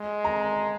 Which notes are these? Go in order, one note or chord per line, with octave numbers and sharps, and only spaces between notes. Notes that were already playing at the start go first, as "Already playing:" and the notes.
Already playing: G#3
A#5